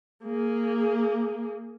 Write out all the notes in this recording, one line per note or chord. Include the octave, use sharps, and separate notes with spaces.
A#3 G#4